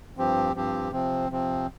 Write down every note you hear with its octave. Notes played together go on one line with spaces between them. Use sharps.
G2 F3 C4 G4
G2 F3 C4 G4
C3 F3 C4
C3 F3 C4